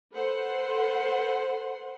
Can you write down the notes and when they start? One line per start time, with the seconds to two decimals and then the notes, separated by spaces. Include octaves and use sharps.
0.13 A4 B4 C5 F#5 C6